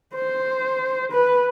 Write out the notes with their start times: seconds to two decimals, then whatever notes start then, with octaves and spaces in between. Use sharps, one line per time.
0.15 C5
1.12 B4